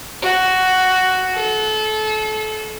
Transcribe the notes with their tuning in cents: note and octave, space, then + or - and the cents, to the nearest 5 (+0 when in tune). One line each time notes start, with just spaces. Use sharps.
F#4 +5
A4 -30